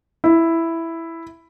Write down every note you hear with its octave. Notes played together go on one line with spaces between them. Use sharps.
E4